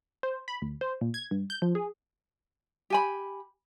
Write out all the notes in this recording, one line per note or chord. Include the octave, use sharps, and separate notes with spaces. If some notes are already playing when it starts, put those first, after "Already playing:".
C5
B5
D2
C5
A#2
G#6
G2
G6
F3
G#4
G4 G#5 B5